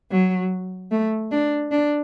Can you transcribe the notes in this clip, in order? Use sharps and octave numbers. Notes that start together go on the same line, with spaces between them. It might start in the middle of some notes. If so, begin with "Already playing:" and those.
F#3
A3
D4
D4